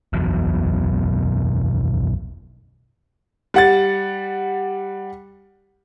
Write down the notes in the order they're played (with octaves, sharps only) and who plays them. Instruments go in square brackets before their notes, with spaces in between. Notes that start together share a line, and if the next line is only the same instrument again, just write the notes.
[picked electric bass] F#1 B1 E2 B2
[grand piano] G3 F#5 A6